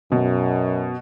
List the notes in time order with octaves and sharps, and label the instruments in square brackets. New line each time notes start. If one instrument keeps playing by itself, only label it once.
[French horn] F#2 [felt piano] B2